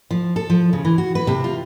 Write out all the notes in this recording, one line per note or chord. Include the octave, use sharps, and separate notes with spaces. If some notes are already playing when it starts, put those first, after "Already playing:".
F3
A4
F3
C#3
E3
F#4
B4
C3
F4